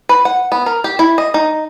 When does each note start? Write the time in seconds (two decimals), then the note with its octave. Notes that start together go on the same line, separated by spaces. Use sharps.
0.09 B4
0.25 F#5
0.52 B3
0.66 A#4
0.84 G4
0.99 E4
1.18 D#5
1.34 D#4